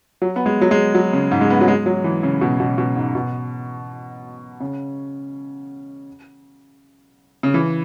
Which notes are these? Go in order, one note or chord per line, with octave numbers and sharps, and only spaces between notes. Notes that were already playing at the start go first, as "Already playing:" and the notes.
F#3
B3
G#3
F#3
G#3
F#3
C#3
G#2
G#3
B3
F#3
G#3
F#3
E3
C#3
B2
B2
B2
G#2
B2
C#3
C#3
E3